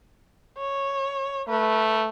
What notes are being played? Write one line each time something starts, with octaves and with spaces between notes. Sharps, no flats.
C#5
A3 B4